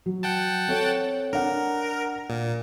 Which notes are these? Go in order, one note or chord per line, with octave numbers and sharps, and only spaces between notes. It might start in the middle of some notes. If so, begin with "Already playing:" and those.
F#3
F#5 G5 A5
C4 A4 C#5
D4 A#4 F#5
A#2